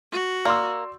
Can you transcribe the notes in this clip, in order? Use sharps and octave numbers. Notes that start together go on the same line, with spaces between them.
F#4
A#3 D5 C6 E6